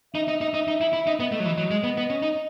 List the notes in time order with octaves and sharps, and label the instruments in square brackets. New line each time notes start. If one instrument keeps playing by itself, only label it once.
[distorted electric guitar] D#4 [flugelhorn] E5
[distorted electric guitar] D#4
D#4
D#4
D#4
E4
E4
D#4
[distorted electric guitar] B3 [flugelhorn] D#5
[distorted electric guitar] A3
F#3
E3
F#3
G#3
B3
B3
C#4
D#4